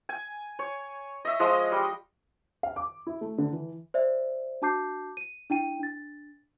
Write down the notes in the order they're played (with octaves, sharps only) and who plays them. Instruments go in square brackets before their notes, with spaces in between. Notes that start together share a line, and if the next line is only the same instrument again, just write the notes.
[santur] G#5
C#5
D#5 E5
F3 G#3 D#5 D#6
G3
[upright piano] F5
D6
E4
A3
D3
E3
[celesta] C5 D5 E5
D4 F#4 A5 D6 G6 C7
D#7
D4 E4 G5 D#7
D4 A6